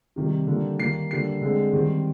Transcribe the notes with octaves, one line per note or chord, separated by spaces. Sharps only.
C3 D#3 G3
D3 G3 A#3
D#3 G3 A#3 C7
D3 G3 A#3 C7
D3 G#3 C4
D#3 G3 C4